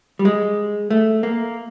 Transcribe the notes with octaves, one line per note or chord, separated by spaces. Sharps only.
G3
G#3
A3
A#3